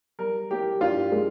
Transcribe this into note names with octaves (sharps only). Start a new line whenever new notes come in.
G3 A#4
A#3 G4
G2 F4
G#3